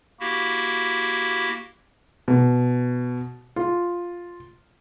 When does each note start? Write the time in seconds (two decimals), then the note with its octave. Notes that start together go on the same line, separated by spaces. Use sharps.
0.20 A#3 E4 F#4 G4
2.28 B2
3.56 F4